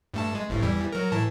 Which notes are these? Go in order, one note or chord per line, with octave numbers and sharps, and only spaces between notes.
G2 A3 A5
G#3
G1 C2 A2
E2 E3 G3
F#3 A#4
A2 E3 A5